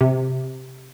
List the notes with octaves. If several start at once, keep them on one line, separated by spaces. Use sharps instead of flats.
C3